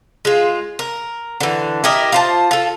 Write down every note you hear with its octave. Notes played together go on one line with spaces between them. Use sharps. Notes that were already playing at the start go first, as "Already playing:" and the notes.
G#3 F4
A#4
D3 E3
E4 G4 A#4 D#5
F4 C5 A5
F4 A4